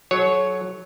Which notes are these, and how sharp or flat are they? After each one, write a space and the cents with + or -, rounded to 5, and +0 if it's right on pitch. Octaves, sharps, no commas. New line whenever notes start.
F#3 +0 A4 -45 C#5 +0